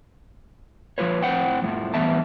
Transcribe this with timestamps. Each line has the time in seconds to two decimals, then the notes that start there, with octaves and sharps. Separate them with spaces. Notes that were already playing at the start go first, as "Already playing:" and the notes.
0.98 F3 G3 F4 B4 C#5
1.22 A2 C4 C5 F#5 G5
1.62 F2 A2 F3
1.94 G2 E3 B3 E5 A5